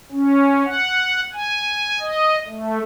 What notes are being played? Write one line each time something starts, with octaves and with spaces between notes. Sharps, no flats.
C#4
F#5
G#5
D#5
A3